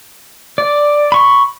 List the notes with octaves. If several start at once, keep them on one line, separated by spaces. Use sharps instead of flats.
D5
B5 C#6